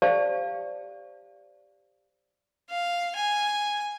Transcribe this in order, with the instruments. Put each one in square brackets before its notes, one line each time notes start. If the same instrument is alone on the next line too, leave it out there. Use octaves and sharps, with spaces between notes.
[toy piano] G4 C5 D5 F5 A5
[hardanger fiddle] F5
G#5